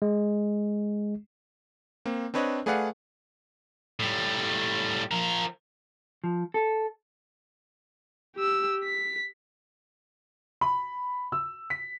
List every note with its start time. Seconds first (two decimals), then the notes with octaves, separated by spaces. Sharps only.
0.02 G#3
2.06 A#3 C4
2.34 C4 D4 B4 C#5 D#5
2.66 A3 G#4 B4 D5 F5 F#5
4.00 A2 G3
5.11 F3 A#4
6.24 F3
6.54 A4
8.36 G4 E6
8.85 B6
10.61 B5
11.32 E6
11.70 B6